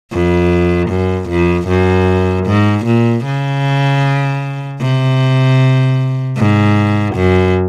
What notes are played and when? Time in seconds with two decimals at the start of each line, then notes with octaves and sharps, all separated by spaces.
0.12 F2
0.90 F#2
1.29 F2
1.68 F#2
2.46 G#2
2.85 A#2
3.25 C#3
4.81 C3
6.38 G#2
7.15 F#2